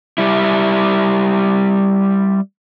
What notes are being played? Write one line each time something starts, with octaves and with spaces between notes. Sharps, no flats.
G3 E4